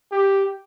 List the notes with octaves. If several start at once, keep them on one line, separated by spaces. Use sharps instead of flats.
G4